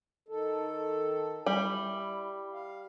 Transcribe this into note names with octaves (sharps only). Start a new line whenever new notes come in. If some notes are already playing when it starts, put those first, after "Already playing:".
D#3 A4
G3 E4
F5